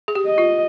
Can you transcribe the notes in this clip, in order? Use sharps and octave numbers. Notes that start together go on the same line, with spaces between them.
G#4
G4
D#5
F4